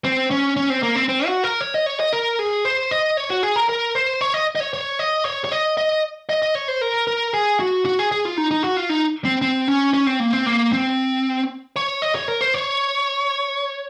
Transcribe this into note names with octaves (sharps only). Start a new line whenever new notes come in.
C4
C#4
C#4
C4
A#3
C4
C4
F#4
A#4
C#5
D#5
C#5
D#5
A#4
G#4
C5
D#5
C#5
F#4
G#4
A#4
A#4
C5
C#5
D#5
D#5
C#5
C#5
D#5
C#5
C#5
D#5
D#5
D#5
D#5
C#5
C5
A#4
A#4
G#4
F#4
F#4
G#4
G#4
F4
D#4
D#4
F#4
F4
D#4
C4
C4
C#4
C#4
C4
A#3
C4
A#3
C4
C#5
D#5
C#5
A#4
C5
C#5